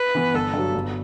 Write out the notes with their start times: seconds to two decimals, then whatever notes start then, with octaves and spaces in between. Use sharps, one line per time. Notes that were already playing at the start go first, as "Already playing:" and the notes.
Already playing: B4
0.15 E3 B3
0.34 G1 A4
0.54 G2 F#3
0.74 G1